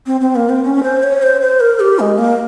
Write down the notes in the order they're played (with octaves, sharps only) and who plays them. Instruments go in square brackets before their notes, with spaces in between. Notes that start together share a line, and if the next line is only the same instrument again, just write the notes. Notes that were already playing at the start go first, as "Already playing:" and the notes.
[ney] C4
C4
A#3
C4
C#4
C5
C#5
C5
C5
A#4
G4
G#3
A#3